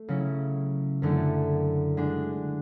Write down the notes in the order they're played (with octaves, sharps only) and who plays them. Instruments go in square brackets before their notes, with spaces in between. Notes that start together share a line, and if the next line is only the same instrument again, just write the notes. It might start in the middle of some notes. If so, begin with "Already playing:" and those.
Already playing: [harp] A3
C#3 F#3 C#4 E4
F#2 D3 A3 E4
D3 G#3 D4